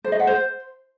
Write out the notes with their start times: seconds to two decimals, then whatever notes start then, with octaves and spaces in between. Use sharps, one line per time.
0.04 C5
0.12 D#5
0.20 F#5
0.27 C5